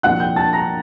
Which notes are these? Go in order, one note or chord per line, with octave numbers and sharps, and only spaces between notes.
C2 A#2 F3 F#5 F#6
G5 G6
A5 A6
A#5 A#6